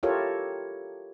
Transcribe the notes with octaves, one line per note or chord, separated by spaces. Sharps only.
E4 F4 G4 A4 A#4 C#5